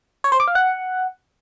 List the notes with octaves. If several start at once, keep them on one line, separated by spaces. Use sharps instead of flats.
C#5
C5
D6
F5
F#5